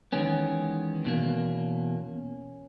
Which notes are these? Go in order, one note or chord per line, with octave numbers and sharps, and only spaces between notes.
E2 D#3 G#3 B3 C#4
E2 B2 A#3